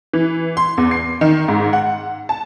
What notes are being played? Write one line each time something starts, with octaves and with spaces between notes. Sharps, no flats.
E3
C6
E2
C7
D#3
G#2
F#5
A5